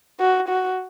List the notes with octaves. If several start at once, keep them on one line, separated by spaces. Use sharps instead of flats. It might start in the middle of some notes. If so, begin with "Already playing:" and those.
F#4
F#4